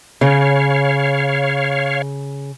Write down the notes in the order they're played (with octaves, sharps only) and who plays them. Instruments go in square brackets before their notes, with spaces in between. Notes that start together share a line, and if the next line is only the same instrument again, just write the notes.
[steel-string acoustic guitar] C#3 [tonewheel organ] C#5 F5